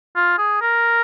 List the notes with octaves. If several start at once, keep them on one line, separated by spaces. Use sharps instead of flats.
F4
G#4
A#4